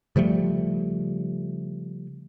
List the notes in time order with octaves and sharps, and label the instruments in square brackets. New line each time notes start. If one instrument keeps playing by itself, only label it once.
[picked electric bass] C#3 F3 G3 A3